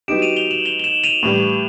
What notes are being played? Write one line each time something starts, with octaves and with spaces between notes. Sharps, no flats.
F#3 B3 D#4 G4 D7 E7
D#7 F7
F7 G7
E7 F#7
F7 G7
G7
E7 F#7
D#7 F7
A2 E3 G3